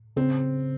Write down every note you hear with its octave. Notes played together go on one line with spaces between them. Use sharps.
C#3 C4
C#3